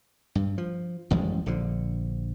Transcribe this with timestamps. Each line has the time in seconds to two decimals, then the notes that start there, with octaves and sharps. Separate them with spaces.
0.35 G2
0.58 F3
1.11 A1 F#2 F3 G#3
1.46 A#1 D3 F3